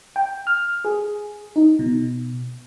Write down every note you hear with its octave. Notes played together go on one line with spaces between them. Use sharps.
G5
F6
G#4
D#4
B2